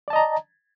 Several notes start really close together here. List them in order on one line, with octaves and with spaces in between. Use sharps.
D5 A5 D#5 A#5